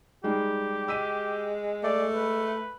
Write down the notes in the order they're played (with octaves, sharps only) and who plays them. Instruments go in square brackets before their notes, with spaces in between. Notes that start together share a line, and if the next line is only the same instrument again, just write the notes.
[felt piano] G3 G#3 D#4 [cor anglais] G4
[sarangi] G#3 [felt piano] E6 B6 D#7
[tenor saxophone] A3 [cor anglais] D5
[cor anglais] B4